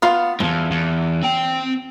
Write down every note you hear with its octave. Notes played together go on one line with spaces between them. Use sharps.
B3 F4 F5
E2 G2 F3
E2
C4 G5